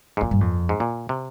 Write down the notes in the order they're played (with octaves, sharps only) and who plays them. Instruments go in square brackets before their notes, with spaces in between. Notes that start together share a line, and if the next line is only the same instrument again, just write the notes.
[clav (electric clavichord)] G#2
[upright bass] F2 [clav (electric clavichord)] A#2
[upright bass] G2
F2
[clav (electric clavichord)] G#2
A#2
C3